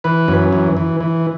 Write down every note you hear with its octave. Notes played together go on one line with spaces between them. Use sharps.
E3 B4
F#2
E3
E3
E3